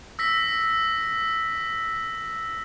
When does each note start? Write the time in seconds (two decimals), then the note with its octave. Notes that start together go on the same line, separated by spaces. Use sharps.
0.19 E6 A#6 B6